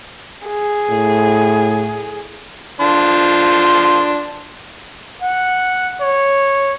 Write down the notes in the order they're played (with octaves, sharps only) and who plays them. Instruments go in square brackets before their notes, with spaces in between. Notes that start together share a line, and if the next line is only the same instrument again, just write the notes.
[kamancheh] G#4
[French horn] A2
[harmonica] F3 D4 C6
[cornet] F#5
C#5